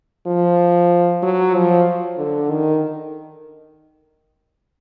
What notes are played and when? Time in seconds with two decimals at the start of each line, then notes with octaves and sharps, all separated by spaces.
0.27 F3
1.23 F#3
1.55 F3
2.18 D3
2.50 D#3